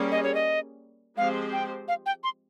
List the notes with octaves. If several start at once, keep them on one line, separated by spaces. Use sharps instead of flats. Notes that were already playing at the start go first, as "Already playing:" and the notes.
Already playing: G3 A#3 C#4 G#4
D#5
C#5
D#5
F3 G#3 C4 G4 C5 F5
G5
F5
G5
C6